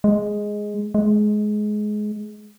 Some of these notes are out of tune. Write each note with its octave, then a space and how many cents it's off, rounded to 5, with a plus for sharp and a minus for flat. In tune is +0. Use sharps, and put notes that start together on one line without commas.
G#3 +0
G#3 +20